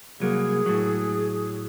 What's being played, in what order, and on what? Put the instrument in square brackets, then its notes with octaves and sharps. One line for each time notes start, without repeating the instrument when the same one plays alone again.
[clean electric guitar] C2 F#3 A#3 [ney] G#4
[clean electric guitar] A2 F#3